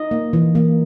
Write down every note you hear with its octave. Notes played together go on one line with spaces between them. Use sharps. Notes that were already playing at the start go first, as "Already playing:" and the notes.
Already playing: D#4 D#5
A#3
E3
A#3